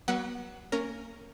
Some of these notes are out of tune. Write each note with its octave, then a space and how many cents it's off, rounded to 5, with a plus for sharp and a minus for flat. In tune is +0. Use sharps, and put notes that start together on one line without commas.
F#3 +25 B3 -35 F#5 +0
A#3 -30 C#4 +0 A#4 +0